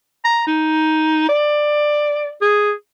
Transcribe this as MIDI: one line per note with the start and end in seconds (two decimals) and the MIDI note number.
0.25 0.42 82
0.47 1.25 63
1.29 2.32 74
2.41 2.72 68